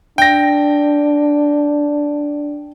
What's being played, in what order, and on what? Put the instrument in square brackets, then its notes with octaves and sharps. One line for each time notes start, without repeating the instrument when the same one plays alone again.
[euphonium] D4 [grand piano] G5 A#6